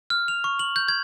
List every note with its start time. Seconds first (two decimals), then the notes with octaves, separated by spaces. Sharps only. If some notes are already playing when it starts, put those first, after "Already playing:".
0.10 F6
0.28 F7
0.44 C#6
0.59 F#7
0.76 G6
0.88 G#6